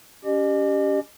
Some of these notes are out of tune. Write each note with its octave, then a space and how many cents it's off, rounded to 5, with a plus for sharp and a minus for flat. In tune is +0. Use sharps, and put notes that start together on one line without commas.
C#4 +30 G4 +0 D#5 -40